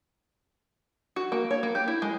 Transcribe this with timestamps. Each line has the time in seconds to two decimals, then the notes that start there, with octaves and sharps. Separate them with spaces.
1.16 F#4
1.32 A#3
1.51 C#5
1.63 A#3
1.75 G4
1.88 E4
2.02 G#3